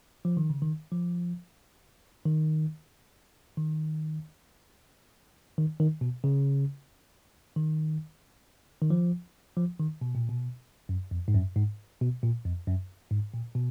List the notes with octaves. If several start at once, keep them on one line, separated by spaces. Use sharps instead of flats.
F3
D#3
C#3
D#3
F3
D#3
D#3
D#3
D#3
B2
C#3
D#3
D#3
F3
F3
D#3
B2
A#2
B2
F#2
F2
G#2
F#2
G#2
B2
A#2
F2
F#2
G#2
A#2
B2